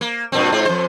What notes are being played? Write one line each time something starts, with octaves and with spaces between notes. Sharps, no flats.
A#3
G2 A#2 C4
G#2 C4 F4
F2 C5